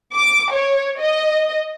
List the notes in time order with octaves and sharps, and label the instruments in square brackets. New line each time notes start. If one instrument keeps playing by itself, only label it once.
[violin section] D6
C#5
D#5